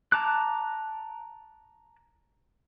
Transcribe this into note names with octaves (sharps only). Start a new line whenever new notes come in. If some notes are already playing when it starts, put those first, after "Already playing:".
A5 A#5 D6 F#6